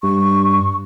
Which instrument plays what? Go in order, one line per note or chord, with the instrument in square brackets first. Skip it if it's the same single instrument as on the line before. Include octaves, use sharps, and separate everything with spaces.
[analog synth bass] G2 [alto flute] C#6